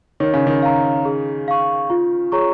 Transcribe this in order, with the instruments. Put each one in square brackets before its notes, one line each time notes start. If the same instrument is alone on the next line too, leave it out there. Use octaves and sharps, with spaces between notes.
[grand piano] D#3 [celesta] C#5
[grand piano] C#3
D#3
[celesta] F5 A#5
G#4
F5 C#6
F4
G#4 C#5 A#5 C#6